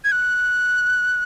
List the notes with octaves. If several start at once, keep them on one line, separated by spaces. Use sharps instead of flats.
G#6
F#6